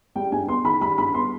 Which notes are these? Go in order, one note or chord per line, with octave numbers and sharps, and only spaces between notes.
G3 G5
G2 G#5
B3 C6
D#3 B5
G3 B5
G2 B5
B3 C6